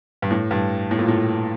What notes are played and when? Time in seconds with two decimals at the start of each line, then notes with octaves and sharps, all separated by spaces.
0.22 G2
0.31 A2
0.51 G2
0.91 A2
0.99 A#2
1.08 A2